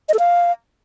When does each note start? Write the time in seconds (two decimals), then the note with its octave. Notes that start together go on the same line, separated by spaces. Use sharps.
0.09 D#5
0.14 A4
0.19 F5